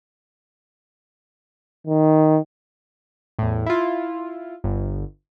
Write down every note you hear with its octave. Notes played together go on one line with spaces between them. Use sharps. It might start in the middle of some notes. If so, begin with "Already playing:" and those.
D#3
E2 A2
E4 F4
G1